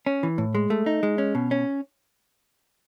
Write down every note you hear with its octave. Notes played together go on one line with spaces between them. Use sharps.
C#4
E3
A2
G#3
A3
D#4
G#3
C#4
B2
C#4